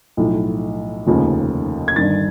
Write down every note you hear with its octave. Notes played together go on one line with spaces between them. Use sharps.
B1 A2 F3
F1 D#2 C#3 F3
G#6
G1 G2 D#3 A6